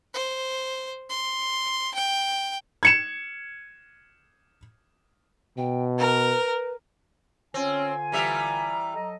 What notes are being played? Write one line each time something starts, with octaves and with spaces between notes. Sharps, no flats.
C5
C6
G5
G#6 C#7 E7
B2 G5
A#4 B4
D3 C4 C#4 F4 G#5
E3 G3 E5 A#5
F#3 A4 D#5